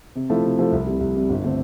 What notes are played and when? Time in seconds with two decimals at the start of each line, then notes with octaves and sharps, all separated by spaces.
0.15 C3
0.29 F3 A3 E4 A4
0.43 C3
0.59 F3 A3 E4 A4
0.72 C2
0.86 C3 G3
1.00 C2
1.16 C3 G3
1.29 G1
1.44 D3 A3 C4